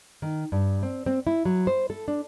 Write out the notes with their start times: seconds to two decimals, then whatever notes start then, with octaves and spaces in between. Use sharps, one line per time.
0.22 D#3
0.52 G2
0.83 C4
1.06 C4
1.27 E4
1.45 F#3
1.67 C5
1.90 A4
2.08 D4